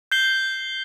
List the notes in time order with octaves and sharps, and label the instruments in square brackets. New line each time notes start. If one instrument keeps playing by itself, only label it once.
[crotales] G6 C7 G7